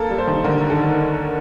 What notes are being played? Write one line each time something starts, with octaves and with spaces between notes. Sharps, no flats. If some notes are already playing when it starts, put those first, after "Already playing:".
Already playing: A#3 A4
G3
C5
D#3
D3 A#4
D#2
A4
D#2